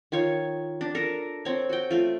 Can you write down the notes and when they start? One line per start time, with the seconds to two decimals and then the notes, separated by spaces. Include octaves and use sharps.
0.12 D#3 F4 C#5
0.81 D4
0.95 A4 A#4
1.45 C4 C#5
1.69 F#4 G5
1.91 A3 F4